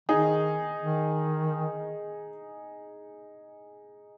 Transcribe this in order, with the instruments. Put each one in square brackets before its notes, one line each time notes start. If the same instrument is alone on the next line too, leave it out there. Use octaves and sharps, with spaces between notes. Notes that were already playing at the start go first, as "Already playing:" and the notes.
[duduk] D#3 [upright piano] D#4 G#4
[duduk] D#3